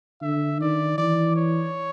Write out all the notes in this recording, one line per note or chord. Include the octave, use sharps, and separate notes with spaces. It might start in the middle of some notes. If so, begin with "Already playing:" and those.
D3 E5
D#3 D5
E3 D5
C#5